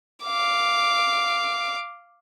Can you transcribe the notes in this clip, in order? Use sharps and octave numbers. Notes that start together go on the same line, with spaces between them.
F5 D6